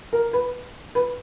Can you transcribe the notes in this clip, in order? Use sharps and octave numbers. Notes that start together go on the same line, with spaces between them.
A#4
B4
B4